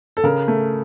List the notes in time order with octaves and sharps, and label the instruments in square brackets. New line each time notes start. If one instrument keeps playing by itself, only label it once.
[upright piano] A4
C#3 A#4
A3